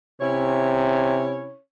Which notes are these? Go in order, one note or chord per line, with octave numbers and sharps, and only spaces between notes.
C3 C#4 E4 C#5